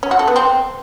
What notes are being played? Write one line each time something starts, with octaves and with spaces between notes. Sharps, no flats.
C#4
F#4
A4
B3
C4